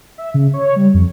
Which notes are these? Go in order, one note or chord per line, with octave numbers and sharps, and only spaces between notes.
E5
C#3
C#5
G3
F2